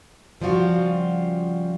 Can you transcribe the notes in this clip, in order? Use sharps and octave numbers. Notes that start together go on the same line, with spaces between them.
C#3 F3 G3 F4 F#4